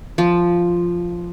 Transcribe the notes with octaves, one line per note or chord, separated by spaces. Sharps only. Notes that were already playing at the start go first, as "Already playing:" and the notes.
F3